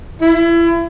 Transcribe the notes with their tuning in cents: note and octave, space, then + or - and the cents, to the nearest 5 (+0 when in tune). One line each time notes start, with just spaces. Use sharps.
E4 +30